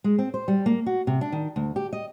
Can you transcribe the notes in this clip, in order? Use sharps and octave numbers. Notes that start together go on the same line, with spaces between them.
G#3
C4
C5
G3
A#3
F#4
C3
D4
D#3
D2
G4
D#5